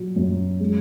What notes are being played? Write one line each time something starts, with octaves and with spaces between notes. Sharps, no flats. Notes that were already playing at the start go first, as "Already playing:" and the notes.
Already playing: A#2 F#3
F#2
G#3